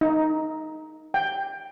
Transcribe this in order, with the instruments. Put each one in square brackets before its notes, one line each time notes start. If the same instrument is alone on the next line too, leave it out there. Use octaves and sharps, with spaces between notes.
[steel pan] D#4
G5